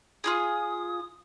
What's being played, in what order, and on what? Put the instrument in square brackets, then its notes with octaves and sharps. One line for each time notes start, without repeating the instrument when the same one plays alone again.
[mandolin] F4 F#4 G#4 [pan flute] D#6